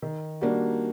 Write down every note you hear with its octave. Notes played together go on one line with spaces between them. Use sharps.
D#3
G3 A#3 D4 F#4